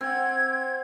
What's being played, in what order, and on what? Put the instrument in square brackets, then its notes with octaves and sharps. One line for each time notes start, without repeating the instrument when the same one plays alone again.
[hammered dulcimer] C4 F#5 [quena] G#6